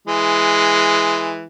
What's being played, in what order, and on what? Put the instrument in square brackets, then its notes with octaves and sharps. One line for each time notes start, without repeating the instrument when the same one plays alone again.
[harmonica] E3 G#3